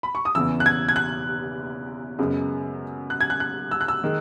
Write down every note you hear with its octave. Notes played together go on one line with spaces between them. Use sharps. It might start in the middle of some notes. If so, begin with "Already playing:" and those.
B5
C#6
D#6
E2 C#3 E3 E6
F#6
G#6
G#6
F#6
F#2 C#3 G#3 B3
F#6
G#6
F#6
F#6
E6
F#6
E6
D#3 G#3